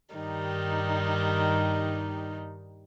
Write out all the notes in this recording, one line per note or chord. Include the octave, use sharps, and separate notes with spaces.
G2 D#3 G3 D#4